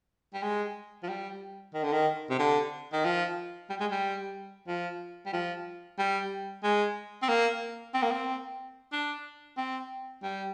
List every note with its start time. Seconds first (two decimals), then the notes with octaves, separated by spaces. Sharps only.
0.34 G3
0.43 G#3
1.03 F3
1.09 G3
1.74 D#3
1.84 D3
1.93 D#3
2.30 C3
2.39 D3
2.93 D#3
3.05 F3
3.69 G3
3.80 G#3
3.91 G3
4.67 F3
5.26 G3
5.33 F3
5.99 G3
6.64 G#3
7.22 C4
7.28 A#3
7.94 C4
8.03 A#3
8.11 C4
8.92 D4
9.57 C4
10.23 G3